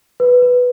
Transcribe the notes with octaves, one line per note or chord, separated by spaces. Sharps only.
B4
B4